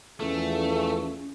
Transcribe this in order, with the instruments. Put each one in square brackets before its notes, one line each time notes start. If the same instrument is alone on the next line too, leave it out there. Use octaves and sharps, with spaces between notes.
[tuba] E2 [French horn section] F3 F4 G#4 [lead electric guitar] A3 [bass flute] C#4